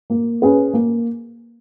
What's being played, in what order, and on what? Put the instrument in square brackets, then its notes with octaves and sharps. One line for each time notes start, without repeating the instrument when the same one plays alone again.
[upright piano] A#3
C#4 G#4 B4
A#3